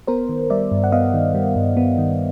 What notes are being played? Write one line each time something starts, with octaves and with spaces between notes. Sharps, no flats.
B3 A#4 C5
D#3
G3 D5 E5
G2
F#5
B3 D#5 F5
D#3
G3
G2
B3
D#3